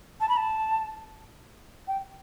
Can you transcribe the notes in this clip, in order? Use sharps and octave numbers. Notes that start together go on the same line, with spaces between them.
A5
B5
A5
G5